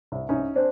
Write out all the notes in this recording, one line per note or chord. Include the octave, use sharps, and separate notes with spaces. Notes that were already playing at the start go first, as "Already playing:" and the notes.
C2
C2 C#4 D#4
C4 D4